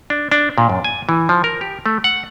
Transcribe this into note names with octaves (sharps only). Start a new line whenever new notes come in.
D4
D4
A#2
F#2
G#5
E3
F3
A#4
G4
A3
F#5